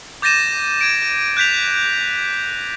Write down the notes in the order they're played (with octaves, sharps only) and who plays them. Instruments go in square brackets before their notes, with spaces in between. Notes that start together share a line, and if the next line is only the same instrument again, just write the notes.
[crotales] D6 G6 A6 A#6 D#7 E7
G#6 D7
F#6 G6 B6 F7